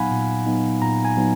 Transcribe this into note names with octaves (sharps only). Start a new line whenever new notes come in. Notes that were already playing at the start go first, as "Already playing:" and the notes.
Already playing: A#2 F#3 B3 D#4 F5 F#5 G#5 B5
A#2
F#3 B3 D#4
A#2 A#5
G#5
F#3 B3 D#4